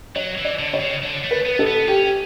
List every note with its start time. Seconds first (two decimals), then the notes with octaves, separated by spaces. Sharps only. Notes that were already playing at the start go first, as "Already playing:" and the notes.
0.16 F#3 C#5
0.38 E3
0.45 D5
0.59 D3
0.73 C#5
0.80 C#3
1.03 D3
1.23 A3
1.31 B4
1.45 B3
1.59 A4
1.67 B3
1.88 C#4 G4